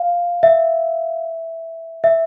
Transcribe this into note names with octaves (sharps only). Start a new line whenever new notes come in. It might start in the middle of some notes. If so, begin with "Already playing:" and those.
Already playing: F5
E5
E5